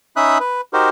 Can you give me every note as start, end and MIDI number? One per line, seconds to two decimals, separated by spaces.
0.16 0.38 61
0.16 0.38 63
0.16 0.38 76
0.16 0.38 83
0.16 0.38 87
0.16 0.38 90
0.40 0.61 71
0.73 0.89 63
0.73 0.89 66
0.73 0.89 67
0.73 0.89 70
0.73 0.89 72